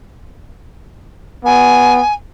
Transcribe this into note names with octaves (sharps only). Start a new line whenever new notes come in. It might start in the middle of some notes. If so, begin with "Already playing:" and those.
B3 G#5